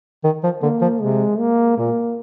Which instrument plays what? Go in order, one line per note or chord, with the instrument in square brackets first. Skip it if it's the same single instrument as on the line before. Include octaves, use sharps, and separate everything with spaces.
[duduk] D#3
F3
[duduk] D3 [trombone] A#3
[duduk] F3
[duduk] C3 [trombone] G#3
[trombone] A#3
[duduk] A#2 [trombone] A#3